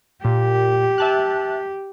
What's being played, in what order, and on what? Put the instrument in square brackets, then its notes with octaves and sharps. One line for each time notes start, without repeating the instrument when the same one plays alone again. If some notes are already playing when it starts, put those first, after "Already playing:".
[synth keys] A#2 [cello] G4
[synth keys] E5 A5 F#6